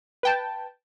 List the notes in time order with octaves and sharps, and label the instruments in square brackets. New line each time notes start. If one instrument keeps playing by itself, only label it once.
[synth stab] B4 G5 A5